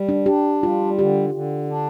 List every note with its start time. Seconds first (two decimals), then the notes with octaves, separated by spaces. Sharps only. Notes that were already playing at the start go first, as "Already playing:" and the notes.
Already playing: G3
0.09 D4
0.26 D4 G4
0.63 G3 F4
0.99 D3 G4
1.34 D3
1.71 D4